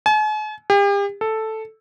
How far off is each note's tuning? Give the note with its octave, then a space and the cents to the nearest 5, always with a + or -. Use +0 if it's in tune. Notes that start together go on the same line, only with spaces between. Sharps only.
G#5 +45
G4 +40
A4 +0